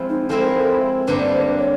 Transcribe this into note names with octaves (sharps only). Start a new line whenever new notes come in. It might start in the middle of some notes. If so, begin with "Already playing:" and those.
Already playing: F3 G#3 C4 E4
D#4
F3 G#3 C4 E4 A4
A#4
A4
G2 D3 G3 A#3 D4 B4
C5
C#5